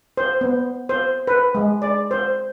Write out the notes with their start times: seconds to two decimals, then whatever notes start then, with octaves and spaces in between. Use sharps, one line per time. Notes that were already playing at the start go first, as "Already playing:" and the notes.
0.17 C5
0.41 B3
0.89 C5
1.27 B4
1.55 G#3
1.82 D5
2.11 C5